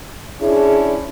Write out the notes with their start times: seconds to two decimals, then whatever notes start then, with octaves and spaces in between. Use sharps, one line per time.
0.41 C#4 D4 E4 G#4